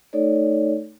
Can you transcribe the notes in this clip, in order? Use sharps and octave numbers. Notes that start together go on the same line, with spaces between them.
A3 D#4 A4 C#5 D5